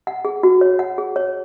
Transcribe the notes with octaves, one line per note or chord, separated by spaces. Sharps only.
F#5
G#4
F#4
C#5
F#5
G#4
C#5